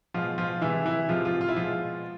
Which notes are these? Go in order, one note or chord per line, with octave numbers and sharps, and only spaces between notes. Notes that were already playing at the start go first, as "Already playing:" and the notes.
B2 F3 G#3 F4
F3 F4
C3 E3 G#3 E4
E3 E4
C3 F3 G#3 F4
F3 F4
F4
E4
B2 F3 G#3 F4